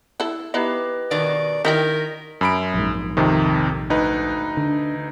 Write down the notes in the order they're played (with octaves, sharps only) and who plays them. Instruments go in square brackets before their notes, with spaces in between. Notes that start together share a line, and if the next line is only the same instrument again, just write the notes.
[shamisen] E4 A4
[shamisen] B3 D#4 E4 [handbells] G4 B4 D#5
[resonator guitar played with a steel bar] B2 D#3 [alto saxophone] D5
[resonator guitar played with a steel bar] D#3 [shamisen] D#4 E4 G4 [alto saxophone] A#4 [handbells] D#5 G6 B6
[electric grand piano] F#2 B5 D7
[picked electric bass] A#1 G#2
[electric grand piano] F2 C3 D#3
D2 D#4 B4
[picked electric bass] D3